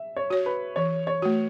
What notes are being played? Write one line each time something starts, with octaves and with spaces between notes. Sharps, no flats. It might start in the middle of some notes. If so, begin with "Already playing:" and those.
Already playing: E5
C#5
F#4 C#5
B4
E3 C#5
C#5
A3 F#4